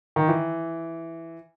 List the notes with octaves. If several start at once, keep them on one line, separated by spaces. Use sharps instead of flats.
D#3
E3